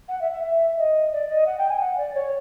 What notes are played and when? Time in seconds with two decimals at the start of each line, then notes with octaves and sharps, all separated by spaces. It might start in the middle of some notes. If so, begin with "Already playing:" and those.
0.09 F#5
0.21 E5
0.32 E5
0.43 E5
0.78 D#5
1.13 D5
1.29 D#5
1.47 F#5
1.58 G5
1.69 G#5
1.80 F#5
1.97 D5
2.15 C#5